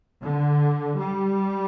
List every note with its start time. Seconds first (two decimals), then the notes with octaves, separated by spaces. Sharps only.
0.22 D3
0.99 G3